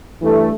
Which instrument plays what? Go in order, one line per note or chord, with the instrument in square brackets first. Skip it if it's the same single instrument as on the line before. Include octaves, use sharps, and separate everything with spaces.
[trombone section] G2 E3 A3